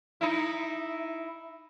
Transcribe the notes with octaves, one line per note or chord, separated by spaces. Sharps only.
D#4 E4